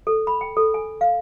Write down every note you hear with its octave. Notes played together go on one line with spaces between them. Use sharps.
A4
B5
G5
A4
G#5
F5